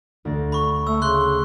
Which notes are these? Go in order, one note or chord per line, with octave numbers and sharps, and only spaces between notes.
D2 D5 A#6
B5 C#6
A3 E6
C#3 C6 F#6 G7